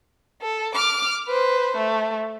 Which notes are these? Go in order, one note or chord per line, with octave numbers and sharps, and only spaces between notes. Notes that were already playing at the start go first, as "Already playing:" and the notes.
A4
D6 F6
B4 C5
A3